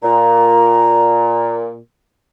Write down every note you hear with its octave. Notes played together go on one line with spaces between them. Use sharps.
A#2 A#5